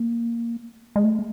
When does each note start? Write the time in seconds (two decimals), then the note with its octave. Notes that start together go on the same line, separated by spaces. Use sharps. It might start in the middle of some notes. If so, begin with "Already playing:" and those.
Already playing: A#3
0.96 G#3
1.04 A3